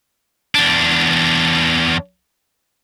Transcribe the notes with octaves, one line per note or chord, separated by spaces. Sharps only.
E2 D4